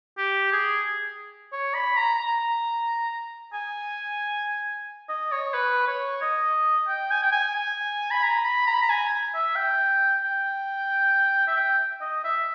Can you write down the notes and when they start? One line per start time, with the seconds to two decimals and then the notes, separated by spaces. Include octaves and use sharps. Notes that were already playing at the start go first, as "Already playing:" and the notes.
0.18 G4
0.52 G#4
1.52 C#5
1.74 B5
1.96 A#5
2.19 A#5
3.53 G#5
5.09 D#5
5.32 C#5
5.53 B4
5.87 C#5
6.22 D#5
6.88 G5
7.11 G#5
7.22 G5
7.32 G#5
7.55 G#5
8.11 B5
8.23 A#5
8.44 B5
8.67 A#5
8.74 B5
8.82 A#5
8.90 G#5
9.34 E5
9.56 G5
10.24 G5
11.47 E5
11.57 G5
12.01 D#5
12.24 E5